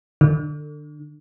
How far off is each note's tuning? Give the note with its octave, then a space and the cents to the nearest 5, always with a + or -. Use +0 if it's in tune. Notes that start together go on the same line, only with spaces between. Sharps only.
D3 +25